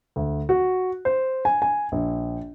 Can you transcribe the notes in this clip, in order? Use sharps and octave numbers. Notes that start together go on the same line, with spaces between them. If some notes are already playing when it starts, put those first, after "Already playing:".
D2
F#4
C5
G#5
G#5
A#1